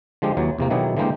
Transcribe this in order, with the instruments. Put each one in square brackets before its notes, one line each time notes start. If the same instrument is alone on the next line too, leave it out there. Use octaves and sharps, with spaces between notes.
[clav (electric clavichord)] D3 F3 G#3 G4
D#2 E3 F#3
E2 C3 A#3
B2 D#3 F#3 E4 G4 G#4
D3 E3 G#3 A#3 G4 G5